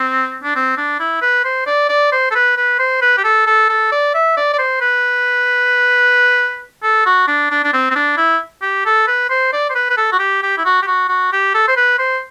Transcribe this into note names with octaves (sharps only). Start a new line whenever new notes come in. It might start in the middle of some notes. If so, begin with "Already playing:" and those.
Already playing: C4
D4
C4
D4
E4
B4
C5
D5
D5
C5
A4
B4
B4
C5
B4
G4
A4
A4
A4
D5
E5
D5
D5
C5
B4
A4
F#4
D4
D4
D4
C4
C4
D4
E4
G4
A4
B4
C5
D5
C5
B4
B4
A4
F#4
G4
G4
E4
F#4
G4
F#4
F#4
G4
A4
C5
B4
C5